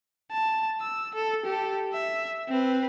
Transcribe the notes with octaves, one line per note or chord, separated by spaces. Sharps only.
A5
E6
A4
G4 A4
E5
C4 B4